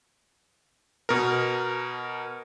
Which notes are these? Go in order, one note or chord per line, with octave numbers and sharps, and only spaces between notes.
B2 A#4